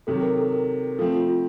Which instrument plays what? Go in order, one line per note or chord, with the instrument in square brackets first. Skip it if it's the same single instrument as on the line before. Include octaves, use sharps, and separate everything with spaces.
[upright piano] C3 D#3 F#3 [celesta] A4
[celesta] A#4
A4
A#4
[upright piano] F3 A3 C4 [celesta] A4
[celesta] F4
F4